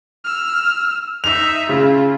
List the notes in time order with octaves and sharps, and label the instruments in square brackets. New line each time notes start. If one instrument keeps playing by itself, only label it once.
[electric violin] E6 F6
[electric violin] D#4 E5 [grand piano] F7
[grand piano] C#3 [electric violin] E4 F4